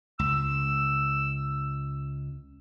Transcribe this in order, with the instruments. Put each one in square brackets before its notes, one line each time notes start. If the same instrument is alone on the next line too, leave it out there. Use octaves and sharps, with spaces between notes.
[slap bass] C#2 [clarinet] E6